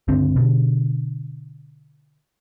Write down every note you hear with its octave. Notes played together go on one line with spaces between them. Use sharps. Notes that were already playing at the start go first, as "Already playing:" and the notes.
G1 C#2 D3 C4
B2 D3